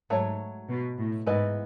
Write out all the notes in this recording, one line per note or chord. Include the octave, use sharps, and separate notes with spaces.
G#2 F#3 A3 C#5
B2
A2
G#2 E3 B3 E4 B4 D#5